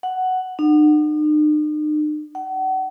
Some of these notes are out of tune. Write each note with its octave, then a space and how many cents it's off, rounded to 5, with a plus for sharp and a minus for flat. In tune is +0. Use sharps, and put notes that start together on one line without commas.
F#5 +5
D#4 -45
F#5 +35